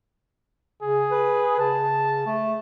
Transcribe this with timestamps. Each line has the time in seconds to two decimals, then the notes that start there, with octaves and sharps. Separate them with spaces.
0.82 C#3 G#4
1.11 B4
1.59 C#3 A5
2.26 A3